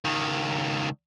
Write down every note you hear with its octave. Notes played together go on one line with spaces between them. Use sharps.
C#2 D#3